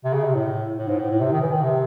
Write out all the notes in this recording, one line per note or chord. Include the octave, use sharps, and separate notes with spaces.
C3
C#3
C3
A2
A2
G#2
A2
A2
C3
D#3
E3
D#3
C3